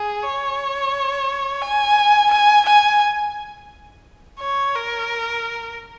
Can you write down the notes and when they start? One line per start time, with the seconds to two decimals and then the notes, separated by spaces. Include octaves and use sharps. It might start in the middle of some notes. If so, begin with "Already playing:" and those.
Already playing: G#4
0.23 C#5
1.62 G#5
2.31 G#5
2.66 G#5
4.40 C#5
4.75 A#4